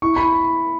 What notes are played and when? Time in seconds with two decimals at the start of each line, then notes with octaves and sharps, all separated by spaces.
0.02 E4 C#6
0.16 B5